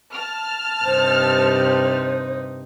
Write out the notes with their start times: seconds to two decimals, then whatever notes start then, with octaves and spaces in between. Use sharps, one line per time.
0.13 A5 F6
0.85 G2 C3 D#4 C5